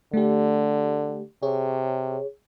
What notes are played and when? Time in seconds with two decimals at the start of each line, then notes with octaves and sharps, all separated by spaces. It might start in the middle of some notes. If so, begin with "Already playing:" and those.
0.13 D3 A3 G4
1.43 C3 G#4 C#5